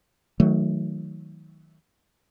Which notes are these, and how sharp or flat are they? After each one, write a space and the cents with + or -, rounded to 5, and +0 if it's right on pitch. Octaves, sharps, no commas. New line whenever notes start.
D#3 +35 F#3 +0 A3 +0